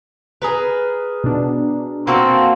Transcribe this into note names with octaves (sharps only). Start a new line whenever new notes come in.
G#4 A#4 B4
B2 D4
A#3 C4 F#4 A4